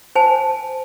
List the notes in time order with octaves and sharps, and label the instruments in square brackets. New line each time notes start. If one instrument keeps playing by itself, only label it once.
[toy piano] C5 G#5 A5